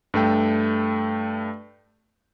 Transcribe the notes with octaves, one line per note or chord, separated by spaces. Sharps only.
G2 A3 G5